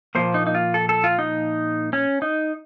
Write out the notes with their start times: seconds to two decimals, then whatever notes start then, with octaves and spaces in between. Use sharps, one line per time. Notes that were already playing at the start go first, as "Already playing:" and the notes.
0.15 A#2 F3 A#3 C5
0.34 D#4
0.47 D#4
0.55 F4
0.74 A4
0.89 A4
1.04 F4
1.19 D#4
1.93 C#4
2.22 D#4